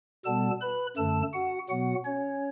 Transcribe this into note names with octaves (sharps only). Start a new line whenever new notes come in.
B2 G3 B3 A4 A5
B4 B5
F#2 D3 A3 A4 A5
F#4 F#5
B2 F#3 B3 F#4 F#5
C#4 C#5